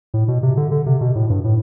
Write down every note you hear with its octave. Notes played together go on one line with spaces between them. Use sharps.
A2
B2
C3
D3
D3
C3
B2
A2
G2
A2